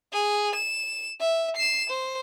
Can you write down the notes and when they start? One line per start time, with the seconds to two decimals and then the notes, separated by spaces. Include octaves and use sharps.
0.13 G#4
0.55 E7
1.20 E5
1.57 C7 E7
1.89 C5